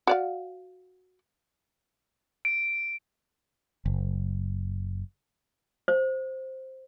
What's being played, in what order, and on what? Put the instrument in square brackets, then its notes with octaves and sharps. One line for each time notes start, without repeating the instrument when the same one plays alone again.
[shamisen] F#4 D5 F5
[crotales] D7
[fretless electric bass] F#1
[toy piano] C5